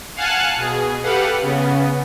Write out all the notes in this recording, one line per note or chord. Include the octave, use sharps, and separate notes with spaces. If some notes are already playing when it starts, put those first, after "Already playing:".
F5 F#5 G#5 A5 F#6
B2 G#4
G4 A4 B4 F5 F#5
C#3 B3